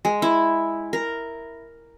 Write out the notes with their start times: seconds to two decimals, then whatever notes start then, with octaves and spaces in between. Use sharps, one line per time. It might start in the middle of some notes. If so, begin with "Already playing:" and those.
0.05 G#3
0.22 E4
0.93 A#4